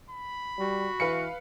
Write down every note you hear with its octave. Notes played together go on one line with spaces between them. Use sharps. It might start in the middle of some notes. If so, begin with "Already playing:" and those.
B5
G3 F#4
E3 B4 F5 C#7